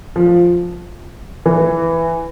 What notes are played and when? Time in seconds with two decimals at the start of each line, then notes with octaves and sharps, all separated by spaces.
0.16 F3
1.46 E3